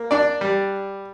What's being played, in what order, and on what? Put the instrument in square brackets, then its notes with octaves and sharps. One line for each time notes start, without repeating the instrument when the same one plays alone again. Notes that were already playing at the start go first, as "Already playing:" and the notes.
Already playing: [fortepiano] A#3
D4 D5
G3